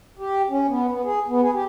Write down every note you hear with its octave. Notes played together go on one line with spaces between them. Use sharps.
G4
C#4
B3
B3
G#4
B3
G#4
G4